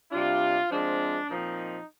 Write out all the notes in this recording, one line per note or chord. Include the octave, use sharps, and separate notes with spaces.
C3 G3 D4 F4
F3 G#3 C4 D4
A#2 F3 C4 D#4